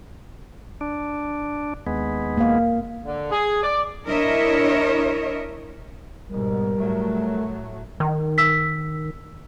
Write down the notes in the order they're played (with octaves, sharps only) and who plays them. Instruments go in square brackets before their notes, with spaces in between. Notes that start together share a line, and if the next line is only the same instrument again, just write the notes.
[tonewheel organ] D4
D#2 G#3 B3
[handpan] A#3 F5
[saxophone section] D3
G#4
D5
[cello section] D4 E4 A#4 C#5 D#5 E5
[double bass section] G#2 B2 [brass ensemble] G3 A#4
[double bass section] A2 F#3 A3
[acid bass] D#3
[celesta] E6 B6